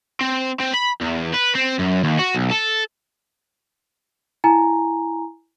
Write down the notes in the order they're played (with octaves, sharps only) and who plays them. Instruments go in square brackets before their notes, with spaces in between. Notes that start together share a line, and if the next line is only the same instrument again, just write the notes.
[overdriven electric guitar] C4
C4
B5
E2
B4
C4
F#2
D#2
F#4
B1
A4
[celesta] E4 G#5 A#5